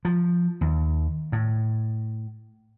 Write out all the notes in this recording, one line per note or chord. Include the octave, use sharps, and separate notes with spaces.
F3
D#2
A2